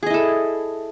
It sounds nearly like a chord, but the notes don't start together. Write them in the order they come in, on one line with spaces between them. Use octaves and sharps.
G#4 D#5 E4 A4